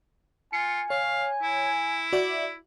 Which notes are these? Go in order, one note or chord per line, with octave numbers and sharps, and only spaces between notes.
F4 G#5 C#7
C#5 F5
E4
F#4 D5 E5